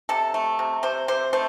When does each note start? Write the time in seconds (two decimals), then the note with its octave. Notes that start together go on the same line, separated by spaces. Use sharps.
0.09 C3 A4
0.34 A3
0.59 C3
0.83 C3 C5
1.08 C3 C5
1.33 A3 C5